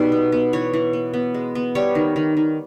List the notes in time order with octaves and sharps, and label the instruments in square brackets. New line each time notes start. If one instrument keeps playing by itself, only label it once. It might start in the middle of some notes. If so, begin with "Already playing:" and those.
Already playing: [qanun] B2 G3 D#4
B3
B3
E3 C#5
E3
B3
B3
G#3
B3
G3 C#5
D#3
D#3
D#3